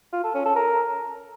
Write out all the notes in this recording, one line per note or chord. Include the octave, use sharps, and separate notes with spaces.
F4
A4
C#4
A4
A#4